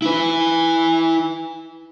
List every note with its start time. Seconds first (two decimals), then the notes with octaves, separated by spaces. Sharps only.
0.02 E4 B4